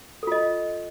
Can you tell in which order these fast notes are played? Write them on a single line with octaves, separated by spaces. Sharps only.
A4 F4 D#5